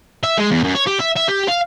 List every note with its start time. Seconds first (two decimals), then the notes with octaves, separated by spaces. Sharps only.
0.23 E5
0.38 G#3
0.51 E2
0.64 F#2
0.75 C#5
0.87 G4
1.00 E5
1.17 E5
1.28 G4
1.48 F5